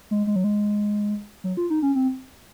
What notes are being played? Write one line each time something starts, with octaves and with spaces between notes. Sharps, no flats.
G#3
G#3
F#3
G#3
F#3
F4
D#4
C#4
C4